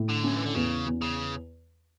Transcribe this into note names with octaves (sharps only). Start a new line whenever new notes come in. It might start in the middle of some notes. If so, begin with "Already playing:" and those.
Already playing: A2 E4
D3
F#3 C#4
E3
D3
E2 C#3
E2
C#3